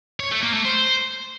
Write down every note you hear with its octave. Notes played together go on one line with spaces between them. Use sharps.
C#5
A3
A#3
A3
C5